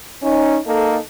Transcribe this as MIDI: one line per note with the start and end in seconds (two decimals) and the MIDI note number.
0.23 0.57 61
0.23 0.57 63
0.66 0.98 58
0.66 0.98 63
0.66 0.98 69